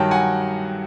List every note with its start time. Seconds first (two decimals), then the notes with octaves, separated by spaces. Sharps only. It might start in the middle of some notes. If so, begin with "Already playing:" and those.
Already playing: G2 D#3 F#3 G5 A5
0.11 F#5 G#5